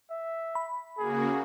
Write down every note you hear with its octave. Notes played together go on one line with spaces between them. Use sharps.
E5
B5
C#3 A#3 F#4 G#4